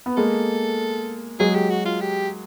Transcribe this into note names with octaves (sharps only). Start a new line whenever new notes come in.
B3
G#3 A#3 A4
F#3 G#3 G#4
G4
F#4
F4
G4